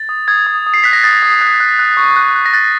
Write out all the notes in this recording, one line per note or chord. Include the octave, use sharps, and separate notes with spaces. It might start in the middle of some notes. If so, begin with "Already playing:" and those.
Already playing: A6
D#6
D#6 G#6
D#6
D#6
C7
F#6 B6
A#6
D#6 A6
D#6
F#6
F#6
F#6
C#6
F#6
F#6
A#6
F#6 A6